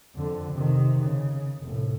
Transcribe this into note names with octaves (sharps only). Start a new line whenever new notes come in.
F2 D3
C3 D#3
C#3
F1 A2